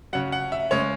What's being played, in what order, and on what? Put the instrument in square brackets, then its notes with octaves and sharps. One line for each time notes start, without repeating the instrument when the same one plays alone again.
[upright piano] C#3 F#3 F#5
F#5
E5
C#3 G#3 C#5